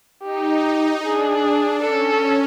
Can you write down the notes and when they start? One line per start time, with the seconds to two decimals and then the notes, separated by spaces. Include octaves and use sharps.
0.23 D#4 G4
1.03 D4 G#4
1.82 C#4 A4